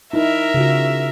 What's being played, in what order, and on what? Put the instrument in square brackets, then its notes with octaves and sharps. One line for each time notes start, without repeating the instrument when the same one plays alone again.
[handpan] D#4 E4 [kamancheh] A#4 E5
[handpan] C#3 F4 F#4